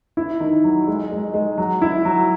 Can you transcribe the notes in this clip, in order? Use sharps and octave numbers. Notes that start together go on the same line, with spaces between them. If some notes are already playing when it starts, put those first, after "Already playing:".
E4
D#3
F#3
G#3
G#3
G#3
F#3
E4
F#3